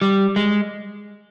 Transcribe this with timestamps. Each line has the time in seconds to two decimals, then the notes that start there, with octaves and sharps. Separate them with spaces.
0.02 G3
0.36 G#3